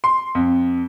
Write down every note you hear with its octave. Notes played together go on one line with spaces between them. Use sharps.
C6
F2